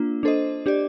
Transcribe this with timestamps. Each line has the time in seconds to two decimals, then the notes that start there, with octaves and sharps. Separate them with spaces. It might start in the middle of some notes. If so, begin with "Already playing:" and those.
Already playing: A#3 D4 F4
0.23 D4 A4 C5 D#5
0.66 D4 G4 D5